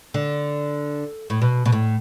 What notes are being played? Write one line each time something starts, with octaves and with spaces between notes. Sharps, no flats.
D3
A2
B2
B2
A2